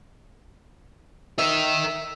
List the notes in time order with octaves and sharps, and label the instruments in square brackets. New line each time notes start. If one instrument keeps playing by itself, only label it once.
[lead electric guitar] A#4 D#5 [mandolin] E5